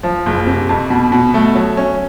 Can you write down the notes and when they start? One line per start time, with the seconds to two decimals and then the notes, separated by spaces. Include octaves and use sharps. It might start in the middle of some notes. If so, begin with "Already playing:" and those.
0.03 F3
0.26 F#1
0.47 C3
0.69 F2
0.90 B2
1.12 B2
1.34 A3
1.55 F#3
1.77 C#4